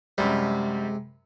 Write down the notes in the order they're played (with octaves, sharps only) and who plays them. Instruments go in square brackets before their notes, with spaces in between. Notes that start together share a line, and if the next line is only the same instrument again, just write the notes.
[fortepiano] F#2 G3 [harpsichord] C3 [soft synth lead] G#3